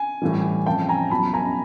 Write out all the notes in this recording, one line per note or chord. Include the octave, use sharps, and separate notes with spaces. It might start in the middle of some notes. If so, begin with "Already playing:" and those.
Already playing: G#5
A2 E3 G3
F2 C#3 F3 G5 A5
G#5 A#5
E2 B2 F#3 A5 B5
G#5 A#5